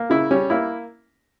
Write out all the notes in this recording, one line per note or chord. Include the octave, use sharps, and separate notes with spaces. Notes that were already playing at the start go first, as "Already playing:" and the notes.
Already playing: A#3
C#3 E4
G3 C#4
A#3 E4